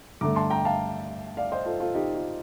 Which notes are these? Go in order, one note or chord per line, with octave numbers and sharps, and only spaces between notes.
G2 D3 A3 A#5 D6
A5 C6
G5 A#5
F5 A5
D5 F5
C5 D#5
F4 A4
F4 A4
D#4 G4
F4